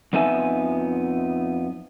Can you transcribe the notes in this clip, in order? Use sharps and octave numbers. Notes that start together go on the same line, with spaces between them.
F2 B3 D#4 E5 G#5